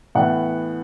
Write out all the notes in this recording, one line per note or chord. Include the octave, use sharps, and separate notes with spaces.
A2 E3 B3 F#5